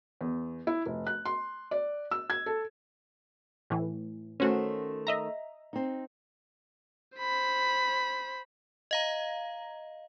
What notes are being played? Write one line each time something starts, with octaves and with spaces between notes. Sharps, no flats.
E2
E4
F1
F#6
C6
D5
E6
G#6
A4
A2 E3
D#3 A3 C#4 F#4 C5
D#5 E5 A#5
C4 D#4
C5 B5
D#5 F5 A#5